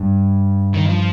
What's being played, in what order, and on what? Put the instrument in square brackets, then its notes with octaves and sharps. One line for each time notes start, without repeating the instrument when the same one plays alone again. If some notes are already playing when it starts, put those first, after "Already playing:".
Already playing: [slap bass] G2
[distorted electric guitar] D#3
F3